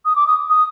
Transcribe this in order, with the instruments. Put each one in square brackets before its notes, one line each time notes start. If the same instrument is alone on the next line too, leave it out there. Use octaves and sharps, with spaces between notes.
[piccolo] D#6
D6
D#6
D#6